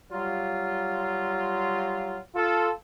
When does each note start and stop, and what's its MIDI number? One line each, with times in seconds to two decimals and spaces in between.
0.12 2.18 54
0.12 2.18 55
0.12 2.18 65
2.35 2.69 65
2.35 2.69 69